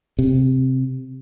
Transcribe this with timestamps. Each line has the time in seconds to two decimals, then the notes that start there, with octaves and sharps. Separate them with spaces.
0.19 C3